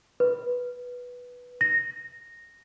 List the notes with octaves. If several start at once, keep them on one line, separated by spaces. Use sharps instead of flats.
B4
A#6